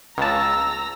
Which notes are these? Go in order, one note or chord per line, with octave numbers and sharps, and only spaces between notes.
C#2 A5 A#5 E6